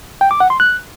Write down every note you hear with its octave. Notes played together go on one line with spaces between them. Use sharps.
G5
D6
F#5
C6
F#6